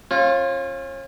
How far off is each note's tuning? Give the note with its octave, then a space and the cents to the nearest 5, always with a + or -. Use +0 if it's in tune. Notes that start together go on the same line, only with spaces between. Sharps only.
C#4 -40 F4 +0